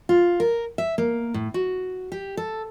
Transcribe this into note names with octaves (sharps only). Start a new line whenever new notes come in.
F4
A#4
E5
A#3
A2
F#4
G4
A4